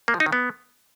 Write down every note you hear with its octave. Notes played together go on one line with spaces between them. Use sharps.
A#3
F3
D#4
D#3
B3